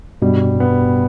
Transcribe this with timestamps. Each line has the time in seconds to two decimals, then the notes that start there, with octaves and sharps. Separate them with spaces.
0.22 G2 B2 G3
0.60 B3